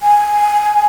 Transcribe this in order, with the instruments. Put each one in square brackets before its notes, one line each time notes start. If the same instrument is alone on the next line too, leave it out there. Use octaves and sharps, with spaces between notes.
[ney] G#5